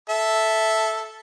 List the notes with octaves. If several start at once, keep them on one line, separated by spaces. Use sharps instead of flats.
A4 E5